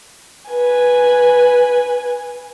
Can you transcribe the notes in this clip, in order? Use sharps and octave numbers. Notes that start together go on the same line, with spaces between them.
B4 G#5